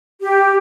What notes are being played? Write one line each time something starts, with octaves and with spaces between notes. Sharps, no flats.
G4